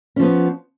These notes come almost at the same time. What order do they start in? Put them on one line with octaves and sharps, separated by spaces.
C#4 F3 B3